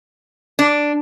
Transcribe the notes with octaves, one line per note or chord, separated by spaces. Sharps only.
D4